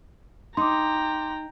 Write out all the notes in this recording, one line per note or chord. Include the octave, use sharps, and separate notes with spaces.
D#4 G5 A#5 C6 D6